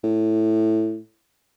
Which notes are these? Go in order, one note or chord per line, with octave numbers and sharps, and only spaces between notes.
A2